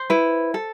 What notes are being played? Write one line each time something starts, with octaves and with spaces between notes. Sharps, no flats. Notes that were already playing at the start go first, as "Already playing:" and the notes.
Already playing: C5
E4 B4
A4